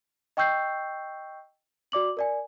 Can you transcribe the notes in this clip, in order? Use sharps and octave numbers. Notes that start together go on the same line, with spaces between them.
D#5 G5 C#6 E6 G6 C7
F#4 D5 D6 F#7
A#4 D5 G#5